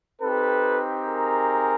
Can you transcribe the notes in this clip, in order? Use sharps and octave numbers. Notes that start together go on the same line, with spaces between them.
C4 D#4 G4 A4 B4
G#4 A#4